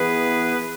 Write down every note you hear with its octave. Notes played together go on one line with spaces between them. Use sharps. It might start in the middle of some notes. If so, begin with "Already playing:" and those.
Already playing: E3 B3 G#4 B4